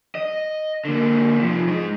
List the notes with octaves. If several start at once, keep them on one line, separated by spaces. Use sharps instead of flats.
D#5
D3 A#3
C3 F3
G#3 D#4